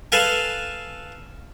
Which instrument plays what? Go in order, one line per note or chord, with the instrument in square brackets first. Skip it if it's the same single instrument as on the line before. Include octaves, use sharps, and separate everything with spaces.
[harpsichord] A4 B4 F5 G#5